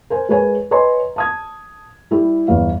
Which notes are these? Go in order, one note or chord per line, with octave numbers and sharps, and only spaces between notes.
A#4 C5 G#5
G#3 A#4 B4 C#5 G#5
B4 C#5 D#5 G#5 A#5 C6
A5 D#6 G#6
G3 E4 G4
G1 E2 F5